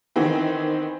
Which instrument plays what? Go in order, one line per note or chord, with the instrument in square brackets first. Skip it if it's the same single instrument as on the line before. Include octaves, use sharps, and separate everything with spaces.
[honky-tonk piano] D#3 E3 B3 C4